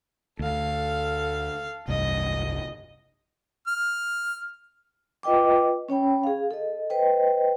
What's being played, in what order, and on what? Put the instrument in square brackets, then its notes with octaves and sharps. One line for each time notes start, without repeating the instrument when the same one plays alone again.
[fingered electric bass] D2 [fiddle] A4 F5
[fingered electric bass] F1 C2 G2 [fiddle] D#5
[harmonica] F6
[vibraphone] F4 B4 D#5 G5 D6
C#4 C#5 G5 B5
G#4 F5
A4 D#5
B4 C5 D#5 G5